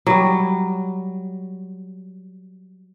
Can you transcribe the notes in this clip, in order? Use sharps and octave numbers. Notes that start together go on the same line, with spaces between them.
F#3 G3